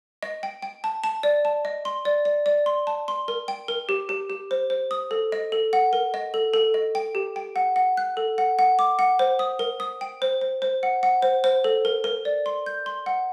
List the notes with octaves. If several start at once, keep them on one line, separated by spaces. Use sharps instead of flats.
D#5
G5
G5
A5
A5
D5
A5
D#5
C6
D5
D5
D5
C6
A5
C6
A#4
G5
A#4
G4
G4
G4
C5
C5
D#6
A4
D#5
A4
F#5
A#4
D#5
A4
A4
D#5
G5
G4
G5
F#5
F#5
F#6
A4
F#5
F#5
D6
F#5
C5
D#6
A#4
D#6
G5
C5
C5
C5
F#5
F#5
C5
C5
A4
A#4
A#4
D5
C6
G6
C6
F#5